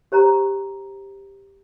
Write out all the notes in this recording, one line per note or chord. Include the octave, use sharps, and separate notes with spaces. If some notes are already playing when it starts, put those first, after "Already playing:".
G4 C5 A#5